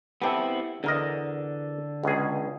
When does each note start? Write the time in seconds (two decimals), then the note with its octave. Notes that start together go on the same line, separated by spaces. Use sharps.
0.22 B3 C4 E4 G4 A4 G5
0.84 E2 D3 A#4 D#5
2.04 C#2 B2 G#4